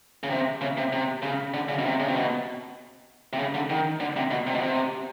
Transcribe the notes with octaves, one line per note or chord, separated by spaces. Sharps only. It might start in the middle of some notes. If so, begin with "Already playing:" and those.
C#3
C3
C#3
C3
C3
C#3
D3
C#3
B2
C3
C#3
C3
B2
C3
C#3
D3
D#3
D3
C3
B2
C3
B2
C3